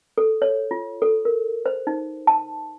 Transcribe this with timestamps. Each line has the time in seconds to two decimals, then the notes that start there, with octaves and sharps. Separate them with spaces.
0.18 A4
0.42 C#5
0.71 F4
1.02 A4
1.25 A#4
1.66 C5
1.87 D#4
2.27 A5